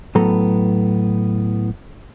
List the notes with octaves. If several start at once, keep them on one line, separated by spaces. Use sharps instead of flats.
A2 F#3 B3 A4 A#5